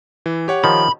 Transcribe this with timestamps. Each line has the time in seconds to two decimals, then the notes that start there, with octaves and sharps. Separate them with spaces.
0.26 E3
0.48 G4 C#5 F#5
0.64 D#3 F3 B5